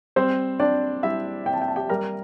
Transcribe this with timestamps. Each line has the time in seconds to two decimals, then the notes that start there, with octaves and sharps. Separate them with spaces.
0.16 G3 C4 C5
0.60 C4 D4 D5
1.03 G3 E4 E5
1.46 C4 G5
1.54 A5
1.61 G5
1.68 A5
1.76 G4 G5
1.89 G3 A#4 A#5